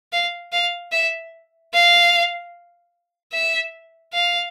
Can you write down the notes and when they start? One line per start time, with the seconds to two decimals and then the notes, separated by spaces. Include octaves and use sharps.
0.12 F5
0.52 F5
0.92 E5
1.73 F5
3.33 E5
4.13 F5